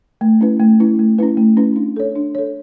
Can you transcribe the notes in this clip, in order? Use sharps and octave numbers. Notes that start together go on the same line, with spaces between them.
A3
C#4 E4 B4
A3
C#4 E4 B4
A3
C#4 E4 B4
A3
C#4 E4 B4
D4
A4 C#5
D4
A4 C#5